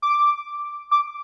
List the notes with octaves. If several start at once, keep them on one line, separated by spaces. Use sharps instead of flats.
D6
D6